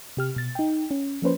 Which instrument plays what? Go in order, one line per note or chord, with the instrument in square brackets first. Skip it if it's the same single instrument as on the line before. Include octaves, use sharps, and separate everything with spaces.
[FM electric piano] C3 G4 F6
B2 A6
D#4 G5
C#4
F3 A#3 C#4 B4 C5